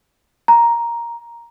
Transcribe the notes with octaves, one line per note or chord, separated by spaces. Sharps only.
A#5